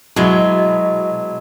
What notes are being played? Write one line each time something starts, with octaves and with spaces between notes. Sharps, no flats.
B2 F#3 G#3 E4